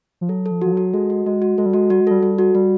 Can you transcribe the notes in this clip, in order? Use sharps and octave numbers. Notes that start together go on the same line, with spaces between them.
F3
F#3 A4
A4
F3
F3 F#4
F#3 F#4
G#3 A4
F#4
G#3 F#4
F#4
G#3 A4
G3
G#3 F#4
G3 F#4
G#3
G3 A4
G3 A4
F#4
G3 F#4